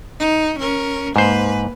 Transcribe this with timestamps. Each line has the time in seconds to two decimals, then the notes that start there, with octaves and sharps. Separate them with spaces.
0.20 D#4
0.59 C#4 A#4
1.16 G#2 A#3 B4 C5